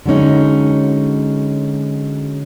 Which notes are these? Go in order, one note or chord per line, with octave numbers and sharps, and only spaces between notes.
D3 F#3 G#3 C#4 D#4